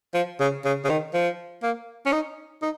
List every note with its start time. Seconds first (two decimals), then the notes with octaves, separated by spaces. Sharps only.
0.14 F3
0.40 C#3
0.65 C#3
0.85 C#3
0.89 D#3
1.14 F3
1.63 A#3
2.06 C#4
2.12 D#4
2.62 D#4